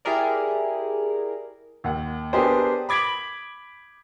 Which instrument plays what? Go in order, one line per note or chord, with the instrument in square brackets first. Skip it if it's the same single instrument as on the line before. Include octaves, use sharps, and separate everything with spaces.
[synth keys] E4 G4 G#4 A#4 D5
[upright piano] D#2 F#5
B3 D4 G4 G#4 A#4 C5
B5 D6 G#6 B6 D7 F#7